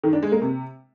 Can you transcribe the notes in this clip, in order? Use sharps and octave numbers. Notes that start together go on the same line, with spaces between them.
D#3
D4
G#3
A#3
C3